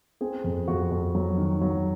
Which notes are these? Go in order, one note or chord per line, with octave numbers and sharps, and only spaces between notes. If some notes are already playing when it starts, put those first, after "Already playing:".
C4 G#4
F2
F2 F#4
F2
F#3
D#3
F#3